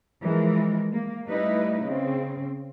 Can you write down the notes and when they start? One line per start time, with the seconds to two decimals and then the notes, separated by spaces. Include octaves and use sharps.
0.22 E3 F3 G#3 A#4
0.92 A#3
1.25 G3 A3 D#4 E4 B4
1.84 C#3 C4